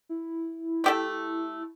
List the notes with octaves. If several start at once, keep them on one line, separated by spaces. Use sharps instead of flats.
E4
A3 G4 A4